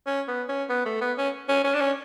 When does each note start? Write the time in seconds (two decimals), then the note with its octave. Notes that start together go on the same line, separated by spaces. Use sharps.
0.07 C#4
0.28 B3
0.49 C#4
0.70 B3
0.86 A3
1.01 B3
1.18 C#4
1.49 C#4
1.64 C#4
1.74 D4
1.81 C#4